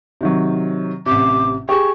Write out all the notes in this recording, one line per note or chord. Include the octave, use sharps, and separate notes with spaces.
C3 D#3 F#3
A1 C3 D6
G4 G#4 C#6